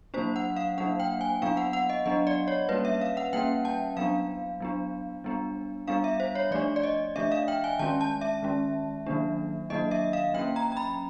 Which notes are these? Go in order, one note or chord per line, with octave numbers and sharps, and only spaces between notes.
F#3 A#3 D4 C5
F#5
F5
F#3 A#3 D4 F#5
G5
G#5
F#3 B3 D4 F5
F#5
F#5
D#5
F#3 B3 D4 D#5
D5
C#5
G3 A#3 C#4 B4
E5
F5
F#5
G3 A#3 C#4 G5
A5
F#3 B3 D4 F5
F#3 B3 D4
G3 B3 D4
G3 B3 D4 F5
E5
C5
C#5
F3 A3 D4 D5
D5
D#5
F3 A3 D4 E5
F5
G5
G#5
D#3 G#3 C#4 A5
A5
E5
D#3 G#3 C#4
D#3 F#3 A#3 D4
D#3 F#3 A#3 D4 D#5
E5
F5
F#3 A#3 C#4 G5
A#5
A#5
B5